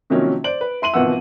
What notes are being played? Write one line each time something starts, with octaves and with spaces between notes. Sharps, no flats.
C3 D#3 F3 F#3 A#3 C#4
C5 D5 D7 F#7
B4
E4 C6 D#7 F#7
G#1 B2 E3 F3 F#5 E6